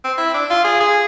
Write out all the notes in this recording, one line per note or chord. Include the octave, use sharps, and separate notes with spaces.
C4
E4
D4
F4
G#4
G#4